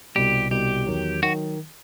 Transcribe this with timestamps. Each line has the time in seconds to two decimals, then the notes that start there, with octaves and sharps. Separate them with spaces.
0.16 C2 B2 G3 G4
0.51 C2 B2 G3 G4
0.87 E2 D#3 F#3
1.23 D#3 F#3 F#4